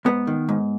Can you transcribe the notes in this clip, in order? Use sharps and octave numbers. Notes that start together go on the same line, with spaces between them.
G#2 B3
D#3
G#2